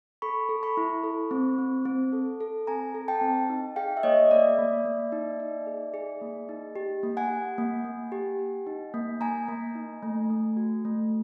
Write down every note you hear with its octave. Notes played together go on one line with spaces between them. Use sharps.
A4 B5 C#6
A4
B5 C#6
E4
A4
C4
C4
C4
A4
A4
C4 G#5 A#5
A4
G5 A5
C4
D#4
G#4 F5 G5
E5
A#3 C#5 D#5
A#3 D5 E5
A#3
A#3
D#4
D#4
G#4
G#4
A#3
D#4
G4
A#3
F#5 G#5
G4
A#3
A#3
G4
G4
D#4
A#3
A#3 G#5 A#5
A#3
D#4
A3
A3
F#4
A3